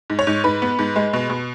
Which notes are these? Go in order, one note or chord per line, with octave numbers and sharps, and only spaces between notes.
G#2
C#5
G#2
G#2 B4
B3
G#2
G#3
B2
B2